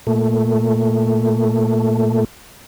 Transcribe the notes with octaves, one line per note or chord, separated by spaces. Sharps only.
A#2 A3